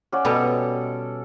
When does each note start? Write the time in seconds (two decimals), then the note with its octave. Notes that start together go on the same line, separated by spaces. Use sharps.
0.12 C#4 D5 F#5
0.25 B2 G3 B3 A4